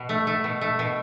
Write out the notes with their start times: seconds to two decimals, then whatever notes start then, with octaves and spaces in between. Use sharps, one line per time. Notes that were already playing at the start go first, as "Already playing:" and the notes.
Already playing: B2
0.09 A3
0.27 A3
0.44 B2
0.61 A3
0.79 B2